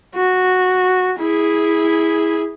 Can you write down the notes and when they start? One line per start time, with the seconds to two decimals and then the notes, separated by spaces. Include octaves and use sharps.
0.15 F#4
1.19 E4 G#4